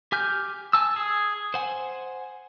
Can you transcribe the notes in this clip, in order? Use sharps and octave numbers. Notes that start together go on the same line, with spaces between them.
G4 G#5 F6 G6
G#5 A5 E6
G#4
C5 F#5 G#5